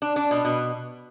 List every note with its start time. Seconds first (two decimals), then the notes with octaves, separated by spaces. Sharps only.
0.02 D4
0.16 D4
0.31 B2
0.45 B2